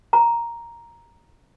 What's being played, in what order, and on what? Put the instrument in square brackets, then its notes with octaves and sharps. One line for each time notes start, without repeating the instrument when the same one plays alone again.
[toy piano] A#5